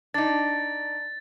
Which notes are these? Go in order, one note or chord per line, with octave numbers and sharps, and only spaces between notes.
D4 D#4 A6